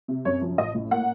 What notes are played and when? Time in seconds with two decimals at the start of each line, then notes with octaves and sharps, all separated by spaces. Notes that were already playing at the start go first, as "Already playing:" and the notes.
0.08 C3
0.25 F#2 C#5
0.42 F3
0.58 A1 D#5
0.75 A2
0.91 A#3 F#5